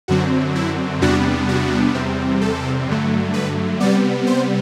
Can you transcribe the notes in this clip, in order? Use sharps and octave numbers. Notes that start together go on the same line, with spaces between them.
F#2 D3 F#3 C4 F#4
E4
E2 C3 G3 B3 D4 F#4
F#4
E2 C3 G3 C4
A4
G2 D3 F#3 A3
B4
C3 G3 B3 D5
C5